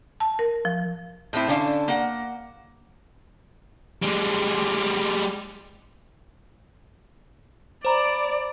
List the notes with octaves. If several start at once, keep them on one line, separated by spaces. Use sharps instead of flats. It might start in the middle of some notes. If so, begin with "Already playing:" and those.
A5
A#4
F3
A2 A3 C4 E4
D3 C#4 D4 F5
A#3 F#5
G3 G#3
C5 D5 A#5 B5